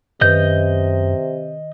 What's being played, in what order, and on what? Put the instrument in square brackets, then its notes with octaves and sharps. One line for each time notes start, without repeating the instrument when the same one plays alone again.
[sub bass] F#2 [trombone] C3 [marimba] D#3 B4 [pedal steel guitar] D#5 G6